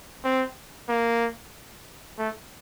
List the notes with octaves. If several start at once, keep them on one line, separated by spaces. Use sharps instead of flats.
C4
A#3
A3